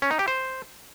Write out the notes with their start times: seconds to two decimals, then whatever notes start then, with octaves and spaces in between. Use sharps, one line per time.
0.02 C#4
0.11 D#4
0.19 G4
0.28 C5